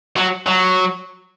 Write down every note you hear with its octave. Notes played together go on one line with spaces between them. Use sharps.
F#3
F#3